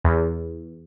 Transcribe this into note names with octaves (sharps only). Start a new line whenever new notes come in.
E2